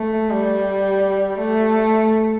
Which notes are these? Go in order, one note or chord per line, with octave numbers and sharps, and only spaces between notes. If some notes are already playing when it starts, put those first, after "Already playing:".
Already playing: A3
G3
A3